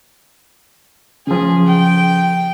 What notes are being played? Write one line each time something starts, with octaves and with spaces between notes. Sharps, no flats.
C#3 F3 G#4
G5